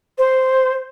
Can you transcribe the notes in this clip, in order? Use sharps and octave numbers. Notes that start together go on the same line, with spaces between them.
C5